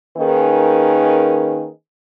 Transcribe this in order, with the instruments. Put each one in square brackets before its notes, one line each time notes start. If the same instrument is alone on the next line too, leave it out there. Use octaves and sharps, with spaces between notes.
[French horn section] D#3 A#3 C#4 D#4 G#4 B4